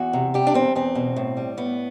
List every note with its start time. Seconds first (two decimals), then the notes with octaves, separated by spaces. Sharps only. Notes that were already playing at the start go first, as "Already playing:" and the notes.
Already playing: E2 F#4
0.13 C3
0.34 G3 G4
0.47 D4
0.54 E2 C4
0.76 E2 C4
0.95 B2
1.16 A2
1.37 G3
1.57 A2 B3